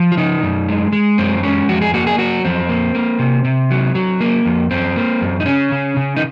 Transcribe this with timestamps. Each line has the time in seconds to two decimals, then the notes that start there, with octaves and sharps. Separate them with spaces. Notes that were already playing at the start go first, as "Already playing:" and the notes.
Already playing: F3
0.12 F4
0.17 C#3 D#4
0.43 F#2
0.69 G#3
0.92 G#3
1.18 F#2 C4
1.43 G#3 C#4
1.68 F2 F#4
1.81 G#4
1.94 A#3 F#4
2.07 G#4
2.18 F#3 F#4
2.45 F2 C4
2.69 A#3
2.95 A#3
3.19 C3
3.45 C3
3.71 F#3
3.95 F#3
4.21 A#3
4.46 F2
4.71 F#2 C4
4.96 A#3
5.21 F#2
5.40 D#4
5.46 C#3 C#4
5.72 C#3
5.97 C#3
6.16 D#4